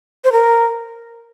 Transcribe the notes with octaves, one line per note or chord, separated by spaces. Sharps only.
C5
A#4